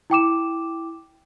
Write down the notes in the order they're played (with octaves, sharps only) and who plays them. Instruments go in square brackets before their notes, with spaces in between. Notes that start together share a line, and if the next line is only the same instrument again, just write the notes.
[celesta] E4 G5 D6 E7